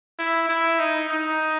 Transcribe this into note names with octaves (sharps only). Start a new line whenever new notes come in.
E4
E4
D#4
D#4